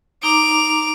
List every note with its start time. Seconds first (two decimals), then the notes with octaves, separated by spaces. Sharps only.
0.23 D#4 A#5 D6 D7 F7